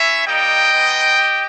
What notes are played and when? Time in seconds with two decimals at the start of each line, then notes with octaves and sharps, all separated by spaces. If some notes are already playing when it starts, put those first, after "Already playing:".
Already playing: C#4 E4 C#5 E5
0.26 G3 A#3 D#4 G4 D#5 G5
0.72 G#3 B3 D#4
1.18 G4